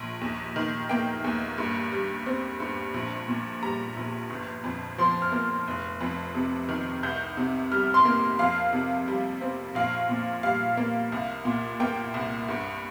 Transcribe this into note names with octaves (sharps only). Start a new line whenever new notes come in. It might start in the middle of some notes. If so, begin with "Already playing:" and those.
Already playing: A#1
D#2
D#3
A#3 G5
D#2
G2
G3
C4
G2
A#1
A#2
G3 A#5
A#1
G1
F2
F3 C6
F6
A#3
F1
F2
C3
D#3
C2 G6
C3
G3 F6
C6
A#3
F2 F5
C3
G3
C4
A#1 F5
A#2
G3 F5
A#3
C2
A#2
A#3 G5
C2
G2